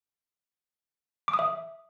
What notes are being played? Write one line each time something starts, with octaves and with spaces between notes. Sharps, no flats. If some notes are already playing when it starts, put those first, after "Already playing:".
D6
D#6
E5